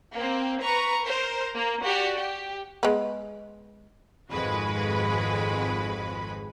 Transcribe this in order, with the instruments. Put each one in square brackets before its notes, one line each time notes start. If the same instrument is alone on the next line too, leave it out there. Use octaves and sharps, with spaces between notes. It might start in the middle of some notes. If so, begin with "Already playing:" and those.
[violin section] A#3 C4
B4 A#5 C#6
A#4 C5
A#3
F#4 G4 D5
G4
[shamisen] G#3 B3
[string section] G#1 F2 G#3 F#4 B4 B5